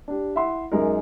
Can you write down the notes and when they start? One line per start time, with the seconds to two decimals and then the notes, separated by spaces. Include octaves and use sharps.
0.08 D4 G4
0.35 E4 E5 F#5 C6
0.72 F#2 G#3 D#4 A#4